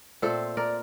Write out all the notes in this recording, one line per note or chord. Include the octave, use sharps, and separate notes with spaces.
A#2 A3 C4 A4 C5
A#4 D5